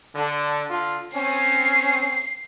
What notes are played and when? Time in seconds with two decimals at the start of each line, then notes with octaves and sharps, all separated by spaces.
0.15 D3
0.69 D3 F4
1.14 C4 C#4 C7